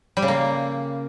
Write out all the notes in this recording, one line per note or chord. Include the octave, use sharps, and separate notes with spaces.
G3
C#3
A#3